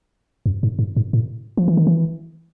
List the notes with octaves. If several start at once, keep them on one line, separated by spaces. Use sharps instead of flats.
F#2
G#2
G#2
G#2
A2
F3
E3
D#3
E3